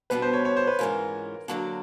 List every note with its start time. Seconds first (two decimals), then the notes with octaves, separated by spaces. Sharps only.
0.10 B2 G3 B3 D4 B4
0.22 C5
0.33 C#5
0.45 C#5
0.57 C5
0.67 B4
0.79 G#2 E3 G#3 C#4 F4 A#4
1.48 D3 F#3 A#3 D4